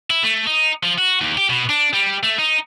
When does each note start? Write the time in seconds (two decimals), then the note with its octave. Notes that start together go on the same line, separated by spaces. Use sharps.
0.10 E4
0.24 A3
0.47 D#4
0.83 F3
0.98 F#4
1.21 D#2
1.38 G4
1.50 B2
1.69 D4
1.93 G3
2.23 A3
2.39 D#4